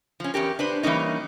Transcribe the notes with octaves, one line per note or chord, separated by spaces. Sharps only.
F3 C#4
E2 C#4 G4 A#4
D4 B4 C5
E3 G3 A#3 C#4 D#4